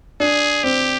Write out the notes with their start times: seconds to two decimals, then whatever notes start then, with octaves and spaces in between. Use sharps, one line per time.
0.20 D4 G#4
0.63 C4 G4